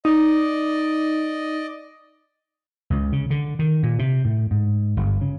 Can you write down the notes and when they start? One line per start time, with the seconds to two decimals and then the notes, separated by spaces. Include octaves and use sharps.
0.05 D#4 D5 D#5
2.90 C#2
3.12 C#3
3.30 D3
3.59 D#3
3.83 A#2
3.99 C3
4.25 A2
4.51 G#2
4.97 G1
5.21 C#3